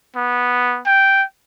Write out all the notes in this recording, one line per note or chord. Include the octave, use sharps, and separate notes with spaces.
B3
G5